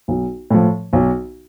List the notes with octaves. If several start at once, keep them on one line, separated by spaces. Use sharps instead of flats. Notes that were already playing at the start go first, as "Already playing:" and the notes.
B1
A2 F3
B1